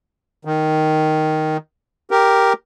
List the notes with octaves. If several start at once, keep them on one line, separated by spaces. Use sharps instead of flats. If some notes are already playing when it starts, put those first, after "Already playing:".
D#3
G4 A#4